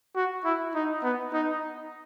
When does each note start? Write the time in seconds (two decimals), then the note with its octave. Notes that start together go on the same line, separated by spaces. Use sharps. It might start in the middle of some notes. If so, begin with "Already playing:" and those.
0.16 F#4
0.45 E4
0.75 D#4
1.03 B3
1.33 D#4